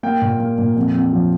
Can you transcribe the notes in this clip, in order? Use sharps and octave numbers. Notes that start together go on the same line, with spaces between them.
A#3 G5
A#2
A#3
A#2
F2
F2
F3